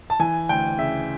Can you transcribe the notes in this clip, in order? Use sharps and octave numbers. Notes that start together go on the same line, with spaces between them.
A5
E3 G#5
D2 G5
C#3 E5